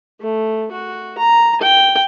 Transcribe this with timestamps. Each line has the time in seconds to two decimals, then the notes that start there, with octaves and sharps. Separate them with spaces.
0.21 A3
0.72 F#4
1.18 A#5
1.61 G5